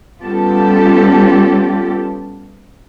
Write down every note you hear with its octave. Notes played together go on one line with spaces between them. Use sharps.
G3 B3 C#4 F4 G4 A4